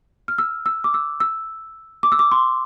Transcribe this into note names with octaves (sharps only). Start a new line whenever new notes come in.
F6
E6
E6
D6
E6
E6
D6
E6
D6
C6